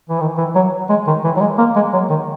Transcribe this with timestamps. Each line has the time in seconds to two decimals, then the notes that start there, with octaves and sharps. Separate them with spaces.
0.09 E3
0.21 D#3
0.38 E3
0.55 F#3
0.90 G#3
1.07 D#3
1.24 E3
1.37 F#3
1.41 G#3
1.58 A#3
1.76 G#3
1.93 F#3
2.10 D#3